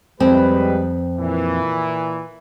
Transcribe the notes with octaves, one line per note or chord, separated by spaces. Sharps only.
F2 G3 G#3 C4 B4
A#2 E3